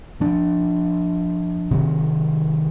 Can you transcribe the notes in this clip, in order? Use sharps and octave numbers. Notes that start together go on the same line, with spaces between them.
F3 A#3 D4
C3 D#3 F#3